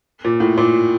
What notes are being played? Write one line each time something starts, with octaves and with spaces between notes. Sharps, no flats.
A#2
A2
A#2